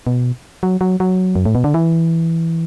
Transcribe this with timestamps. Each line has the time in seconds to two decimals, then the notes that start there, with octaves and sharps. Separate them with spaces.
0.07 B2
0.63 F#3
0.81 F#3
1.00 F#3
1.36 F#2
1.46 A2
1.55 B2
1.64 D3
1.74 E3